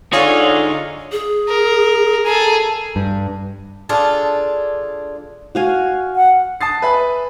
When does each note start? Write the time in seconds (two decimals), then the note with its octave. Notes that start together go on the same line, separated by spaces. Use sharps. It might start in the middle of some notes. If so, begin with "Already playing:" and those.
0.13 D3 D#4 F4 G#4 C#5 F5
1.12 G#4
1.49 A#4
2.26 G#4 A4 A#5
2.96 G2
3.89 D4 F4 G#4 A4
5.55 F#4 F5 G#5
6.16 F#5
6.61 A5 D#6 A6 C7
6.82 B4 E5 G#5 B5